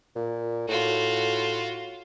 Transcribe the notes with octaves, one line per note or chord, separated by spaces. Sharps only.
A#2
A2 F4 F#4